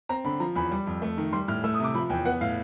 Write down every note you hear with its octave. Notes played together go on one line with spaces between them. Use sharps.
C4 A#5
D3 B5
F3 A#5
E2 B5
G3
F2
A3
D#3
G3 C6
A2 F6
A3 E6
D#6
C3 D6
F3 B5
E2 G5
B3 F#5
A2 F5